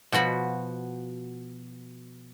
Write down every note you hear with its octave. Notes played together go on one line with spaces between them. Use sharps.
B2 F3 F#4 B5